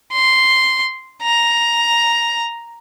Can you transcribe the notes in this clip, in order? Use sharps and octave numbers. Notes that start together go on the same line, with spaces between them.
C6
A#5